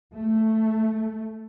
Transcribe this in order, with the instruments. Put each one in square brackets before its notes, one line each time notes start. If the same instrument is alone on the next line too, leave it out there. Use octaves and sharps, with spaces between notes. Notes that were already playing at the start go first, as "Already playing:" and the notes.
[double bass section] A3